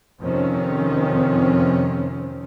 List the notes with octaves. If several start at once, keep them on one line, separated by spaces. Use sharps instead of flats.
F2 C3 D#3 F3 C4 C#4